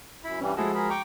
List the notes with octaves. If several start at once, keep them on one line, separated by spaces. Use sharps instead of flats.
F#2 E4 B5
G2 E3 G3 C#4
F3 G#3 E4 F#4 G#4 A4
G#4 A#4 B5
G5 A#5 C#6 D6